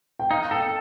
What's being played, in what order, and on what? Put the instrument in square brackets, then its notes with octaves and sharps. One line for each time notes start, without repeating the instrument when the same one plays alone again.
[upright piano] G5
[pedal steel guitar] D#4 [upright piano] F5
[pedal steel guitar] A4 [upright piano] G5